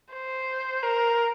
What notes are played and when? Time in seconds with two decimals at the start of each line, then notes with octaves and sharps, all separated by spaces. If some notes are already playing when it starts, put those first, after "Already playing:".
0.14 C5
0.83 A#4